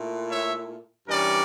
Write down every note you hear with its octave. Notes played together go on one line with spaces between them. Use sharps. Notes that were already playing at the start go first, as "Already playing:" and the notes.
Already playing: A#2 A3 E4
C#5 E5
G2 E3 G3 C#4 A#4 D5